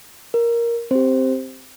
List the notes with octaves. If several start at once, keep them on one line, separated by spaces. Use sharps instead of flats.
A#4
C4 G4 C5